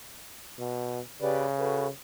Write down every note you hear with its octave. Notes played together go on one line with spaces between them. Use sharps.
B2
C#3 G4 B4 D5
F#4 A4 B4